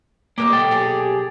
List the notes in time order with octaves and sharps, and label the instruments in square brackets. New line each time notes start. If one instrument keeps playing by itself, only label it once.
[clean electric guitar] A#3 [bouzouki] G4 A#4 D#5
[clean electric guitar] B1 A4 G5
[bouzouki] G4 G#4